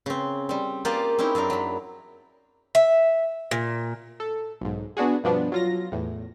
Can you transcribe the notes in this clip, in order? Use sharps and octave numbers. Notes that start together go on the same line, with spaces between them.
C#3 C4
G3 C4
A#3 F4 G4 G#4 C5 D5
C4 C#4 D#4 E4
F#2 C4 D4 A#4
F#3 B5
E5
A#2
A4
B1 G#2
B3 D4 F#4 G#4
G2 B2 F3 B3 D4
F#3 F4 A#6
E2 A2